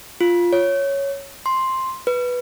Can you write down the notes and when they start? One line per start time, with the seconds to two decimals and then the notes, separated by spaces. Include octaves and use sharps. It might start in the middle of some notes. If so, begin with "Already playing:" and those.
0.21 F4
0.53 C#5
1.46 C6
2.07 B4